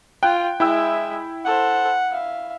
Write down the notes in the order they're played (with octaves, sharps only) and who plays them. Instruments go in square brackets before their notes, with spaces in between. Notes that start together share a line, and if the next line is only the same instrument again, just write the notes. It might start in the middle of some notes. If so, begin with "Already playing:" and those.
[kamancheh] F4 [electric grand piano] G5 F#6
[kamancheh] G#3 E5 [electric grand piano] E4 G5 E6
[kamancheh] A4 C5 [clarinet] F#5
[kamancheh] E5 F5